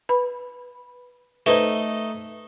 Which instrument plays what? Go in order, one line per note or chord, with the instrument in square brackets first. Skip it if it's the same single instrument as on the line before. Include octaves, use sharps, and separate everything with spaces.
[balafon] B4 B5
[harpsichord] A3 D#4 [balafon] B4 C5